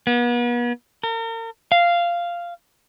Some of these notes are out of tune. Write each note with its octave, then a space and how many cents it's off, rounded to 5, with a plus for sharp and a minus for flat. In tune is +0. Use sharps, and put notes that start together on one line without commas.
B3 -40
A#4 -40
F5 -10